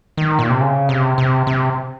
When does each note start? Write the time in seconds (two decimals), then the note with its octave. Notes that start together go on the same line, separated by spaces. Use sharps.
0.17 D#3
0.39 A#2
0.49 C3
0.61 C#3
0.89 C3
1.18 C3
1.47 C3